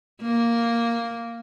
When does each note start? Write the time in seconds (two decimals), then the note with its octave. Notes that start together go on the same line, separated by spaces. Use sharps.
0.22 A#3